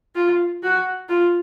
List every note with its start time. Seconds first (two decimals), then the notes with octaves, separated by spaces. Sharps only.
0.15 F4
0.63 F#4
1.09 F4